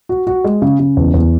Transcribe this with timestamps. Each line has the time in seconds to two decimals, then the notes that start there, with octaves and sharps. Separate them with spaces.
0.09 F#4
0.27 F#4
0.44 G#3
0.62 C#3
0.80 C#3
0.97 E2
1.14 E2